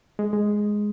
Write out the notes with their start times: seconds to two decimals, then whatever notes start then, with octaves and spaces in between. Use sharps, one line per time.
0.19 G#3
0.33 G#3